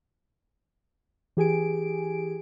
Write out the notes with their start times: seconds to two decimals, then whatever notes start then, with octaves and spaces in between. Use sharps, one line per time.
1.37 E3 G4 G#4 G#5 D7